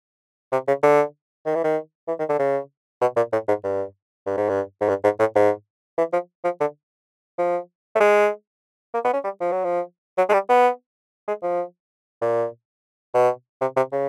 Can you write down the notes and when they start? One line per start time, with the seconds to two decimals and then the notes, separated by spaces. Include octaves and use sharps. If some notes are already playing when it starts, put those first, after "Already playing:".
0.52 C3
0.68 C#3
0.83 D3
1.46 D#3
1.55 E3
1.64 D#3
2.08 E3
2.19 D#3
2.29 D3
2.39 C#3
3.01 B2
3.16 A#2
3.33 A2
3.48 G#2
3.64 G2
4.27 G2
4.37 G#2
4.49 G2
4.81 G#2
4.89 G2
5.04 G#2
5.19 A2
5.36 G#2
5.98 E3
6.13 F3
6.44 F3
6.60 D3
7.38 F3
7.95 A3
8.00 G#3
8.94 A#3
9.04 B3
9.14 C#4
9.24 G3
9.41 F3
9.52 F#3
9.64 F3
10.18 F#3
10.29 G#3
10.33 G3
10.49 B3
11.28 G#3
11.43 F3
12.21 A#2
13.15 B2
13.61 C3
13.77 C3
13.92 C#3